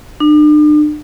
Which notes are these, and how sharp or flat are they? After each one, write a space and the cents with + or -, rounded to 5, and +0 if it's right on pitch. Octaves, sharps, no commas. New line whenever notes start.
D4 +40